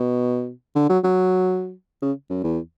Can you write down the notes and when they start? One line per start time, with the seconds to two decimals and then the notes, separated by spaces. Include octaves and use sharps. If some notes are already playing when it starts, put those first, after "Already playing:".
Already playing: B2
0.75 D3
0.89 F#3
1.04 F#3
2.02 C#3
2.30 F#2
2.44 E2